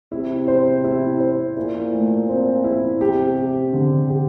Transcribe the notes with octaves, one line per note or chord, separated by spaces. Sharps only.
C3 E4
C5
E4
C5
A#2 E4
A3
C4
E4
C3 G4
G4
D3
G4